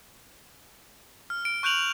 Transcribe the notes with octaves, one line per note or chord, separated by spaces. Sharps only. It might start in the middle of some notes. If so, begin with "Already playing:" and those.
F6
D7
C#6 F#6 G6 D7 F7 F#7